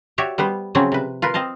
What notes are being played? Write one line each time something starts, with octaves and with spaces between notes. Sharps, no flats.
F#4 G4 C#5 D5 E5
G3 B3 B4 C5
C#3 F3 F#3 C4 C#4
C3 B4
F4 A#4 B4
C4 D#5 F5 A5